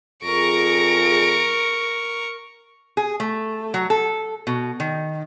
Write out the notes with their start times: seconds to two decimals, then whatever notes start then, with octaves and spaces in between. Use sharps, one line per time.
0.24 F2 F4 G#4 A#4 C#6 A#6 D7
2.97 G#4
3.20 A3
3.74 F#3
3.90 A4
4.47 B2
4.80 D#3